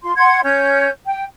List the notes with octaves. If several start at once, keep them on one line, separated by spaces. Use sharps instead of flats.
F4 C6
F#5 C6 G#6
C#4 C#5 G6
G5